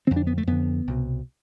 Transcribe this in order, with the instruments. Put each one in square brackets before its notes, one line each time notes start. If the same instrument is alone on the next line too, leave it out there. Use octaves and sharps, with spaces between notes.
[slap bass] D3 C4
F2
D4
B3
A3
F2 D3 B3
C2 B2